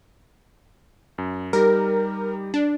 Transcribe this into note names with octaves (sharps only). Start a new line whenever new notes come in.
F#2
G3 D#4 G4 A#4
D4